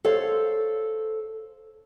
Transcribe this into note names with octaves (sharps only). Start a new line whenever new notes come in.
A4 C5 C#5 F5